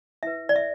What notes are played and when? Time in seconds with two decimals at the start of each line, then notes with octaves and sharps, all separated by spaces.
0.23 E4 B4 E5
0.49 D5
0.56 E5